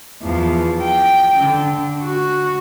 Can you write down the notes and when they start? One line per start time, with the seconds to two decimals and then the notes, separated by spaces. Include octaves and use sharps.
0.23 E2 F3
0.82 G5
1.38 D3
2.03 F#4